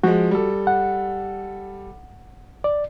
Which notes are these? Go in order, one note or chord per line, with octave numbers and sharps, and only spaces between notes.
F3 G#3 F#4
G3 A4
F#5
D5